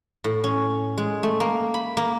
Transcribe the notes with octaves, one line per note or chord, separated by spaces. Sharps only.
A2
C#4
G#3
A3
A#3
B5
A#3